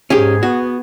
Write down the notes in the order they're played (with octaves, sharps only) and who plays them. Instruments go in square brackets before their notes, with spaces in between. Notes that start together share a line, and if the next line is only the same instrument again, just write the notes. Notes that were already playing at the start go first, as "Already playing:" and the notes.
[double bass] G#2 [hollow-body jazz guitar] C#4 G4 [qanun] G#4
[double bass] B3 [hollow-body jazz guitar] F#4